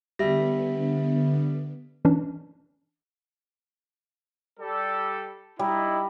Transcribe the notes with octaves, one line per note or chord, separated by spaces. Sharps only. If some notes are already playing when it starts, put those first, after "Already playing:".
D3 G3 B3 E5 A#6
E3 C#4 D4
G3 A4
G3 D#4 E4